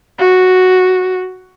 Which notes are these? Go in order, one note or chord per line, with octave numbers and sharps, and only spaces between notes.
F#4